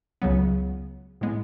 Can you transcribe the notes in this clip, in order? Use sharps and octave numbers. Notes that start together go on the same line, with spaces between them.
C#2 C#3 F#3 B3
A2 G#3 B3